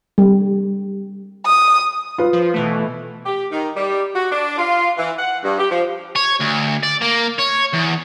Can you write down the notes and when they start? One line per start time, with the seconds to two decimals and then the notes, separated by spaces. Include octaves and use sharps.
0.18 G3
1.46 D#6
2.18 F4 B4
2.33 F3
2.54 B2 E3 A3
3.26 G4
3.52 D#3
3.76 G3
4.15 F#4
4.31 D4
4.58 F4
4.98 E3
5.19 F#5
5.44 G2
5.59 G4
5.71 F3
6.16 C#5
6.40 D2
6.83 D5
7.02 A#3
7.39 C#5
7.74 E2